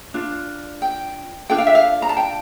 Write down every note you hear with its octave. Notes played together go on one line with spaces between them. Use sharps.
D4 F4
G5
D4 F4 A4 G5
F5
E5
F5
A#5
A5
G5